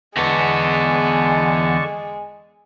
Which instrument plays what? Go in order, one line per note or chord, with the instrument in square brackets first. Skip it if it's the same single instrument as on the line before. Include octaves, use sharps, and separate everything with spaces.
[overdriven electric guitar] E2 B3 [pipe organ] D3 A5 C#6 [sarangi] G#3